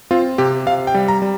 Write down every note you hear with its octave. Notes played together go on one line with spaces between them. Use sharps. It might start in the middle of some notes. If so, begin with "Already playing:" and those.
C4 F4
C3 G4
C3 F5
G5
G3
A#5
G3